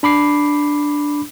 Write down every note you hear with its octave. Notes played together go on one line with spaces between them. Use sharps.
D4 B5 D6 C7